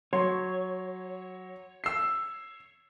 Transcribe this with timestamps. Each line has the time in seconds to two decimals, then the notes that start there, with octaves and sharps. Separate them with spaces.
0.13 F#3 C#5 C6
1.84 E6 C7